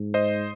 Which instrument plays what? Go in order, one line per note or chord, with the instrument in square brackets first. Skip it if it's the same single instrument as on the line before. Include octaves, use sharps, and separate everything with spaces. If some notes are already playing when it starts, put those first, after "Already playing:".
Already playing: [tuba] G#2
[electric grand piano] C5 D#5